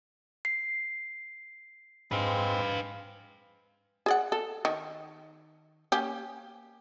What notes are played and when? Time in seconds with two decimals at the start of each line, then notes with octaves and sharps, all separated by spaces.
0.45 C7
2.11 G#2 G#3 C4 B4 F5
4.06 G#4 D5 F#5
4.32 A4
4.65 D#3
5.92 A#3 C#4 G4